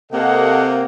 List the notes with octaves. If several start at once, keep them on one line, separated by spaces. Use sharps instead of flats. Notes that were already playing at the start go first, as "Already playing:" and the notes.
C3 A#3 A4 D#5 F#5